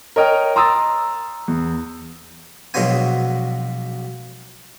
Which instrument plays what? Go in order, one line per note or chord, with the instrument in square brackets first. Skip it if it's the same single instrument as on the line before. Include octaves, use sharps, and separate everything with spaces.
[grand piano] A#4 C#5 D#5 G5 F6
A#5 C6 D#6 E6 A6
E2
[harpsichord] A#1 B2 F#3 G#3 B3 G#5